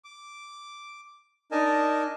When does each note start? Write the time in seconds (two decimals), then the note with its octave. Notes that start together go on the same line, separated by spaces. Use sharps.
0.04 D6
1.52 D4 D#4 A#4 D#5 G#5 A5